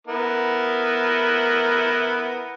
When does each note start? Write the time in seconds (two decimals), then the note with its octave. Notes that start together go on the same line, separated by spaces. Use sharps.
0.07 B3 E4 A#4